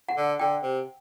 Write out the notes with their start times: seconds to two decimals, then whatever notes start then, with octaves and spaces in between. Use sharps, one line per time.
0.09 F#5
0.17 D3
0.39 D3 G5
0.63 C3